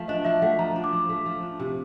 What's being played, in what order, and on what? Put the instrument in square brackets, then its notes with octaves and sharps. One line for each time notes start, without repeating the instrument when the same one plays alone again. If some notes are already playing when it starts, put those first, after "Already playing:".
Already playing: [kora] F3 A3 [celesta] E5
[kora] D4 [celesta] D#5
[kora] F3 [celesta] E5
[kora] A3 [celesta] F#5
[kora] F3 [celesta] A#5
[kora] D4
[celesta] D6
[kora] F3
A3
F3
D4
C3